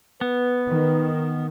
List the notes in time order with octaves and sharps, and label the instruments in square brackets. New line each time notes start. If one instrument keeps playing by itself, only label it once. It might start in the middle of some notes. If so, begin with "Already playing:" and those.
[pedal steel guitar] B3 [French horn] B4
[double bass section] D#3